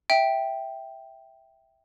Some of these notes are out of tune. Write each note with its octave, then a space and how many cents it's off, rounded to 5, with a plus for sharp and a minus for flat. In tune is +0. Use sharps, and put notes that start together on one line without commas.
E5 -5 G5 +0